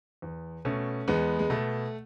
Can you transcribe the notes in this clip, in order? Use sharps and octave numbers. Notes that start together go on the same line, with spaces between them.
E2
B2 A3 C#4
E2 G#3 B3
G#3
B2 A3